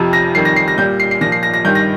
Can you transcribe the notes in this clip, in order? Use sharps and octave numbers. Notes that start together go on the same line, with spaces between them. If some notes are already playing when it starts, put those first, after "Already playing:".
Already playing: F2 C3 F3
A#6
F2 D#3 G3 C7
A#6
C7
A#6
A#2 G3 G6
C7
C7
A#2 F3 A#6
C7
A#6
A#6
G2 D#3 G3 G6
A#6